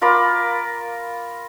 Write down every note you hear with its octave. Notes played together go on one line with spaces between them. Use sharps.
F4 A#4 B5 D6